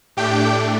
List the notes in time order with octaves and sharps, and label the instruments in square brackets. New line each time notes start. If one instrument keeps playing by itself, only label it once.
[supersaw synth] A2 A3 D4 G4 G5